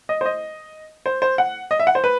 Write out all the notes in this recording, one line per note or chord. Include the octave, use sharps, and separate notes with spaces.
D#5
C5
D#5
C5
C5
F#5
D#5
E5
F#5
C5
B4